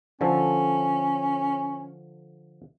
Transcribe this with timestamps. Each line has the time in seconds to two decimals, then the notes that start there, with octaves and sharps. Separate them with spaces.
0.21 D3 F3 C#4 A4